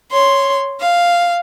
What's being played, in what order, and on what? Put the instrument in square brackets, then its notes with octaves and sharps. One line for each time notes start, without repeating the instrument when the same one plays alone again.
[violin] C#5 C6
F5